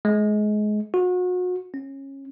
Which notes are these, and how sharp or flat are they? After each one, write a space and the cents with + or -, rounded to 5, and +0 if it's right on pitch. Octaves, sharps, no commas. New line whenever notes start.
G#3 +25
F#4 -35
C#4 -20